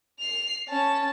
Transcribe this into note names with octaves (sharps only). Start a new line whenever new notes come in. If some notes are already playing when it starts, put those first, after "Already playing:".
C7 F7
C#4 A5